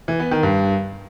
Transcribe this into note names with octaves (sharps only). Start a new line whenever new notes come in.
E3
B3
D#3
G2